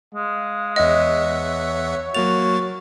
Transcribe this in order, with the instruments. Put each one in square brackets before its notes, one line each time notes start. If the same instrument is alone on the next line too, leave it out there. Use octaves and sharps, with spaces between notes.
[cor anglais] G#3 [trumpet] F5
[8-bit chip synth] E2 E5 F#5 [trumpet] C#5 [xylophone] D#5
[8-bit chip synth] F#3 A#3 A6 [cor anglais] F#4 [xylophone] F7